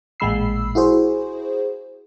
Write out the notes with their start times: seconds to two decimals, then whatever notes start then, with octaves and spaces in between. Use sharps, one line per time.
0.20 A1 A#2 G#3 B5 E6 C7
0.75 E4 F#4 G#4 C5